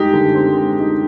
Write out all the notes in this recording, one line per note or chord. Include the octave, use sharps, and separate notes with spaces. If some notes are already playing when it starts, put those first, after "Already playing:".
Already playing: G#3 D#4 G4
D3
C4
G#3
D#4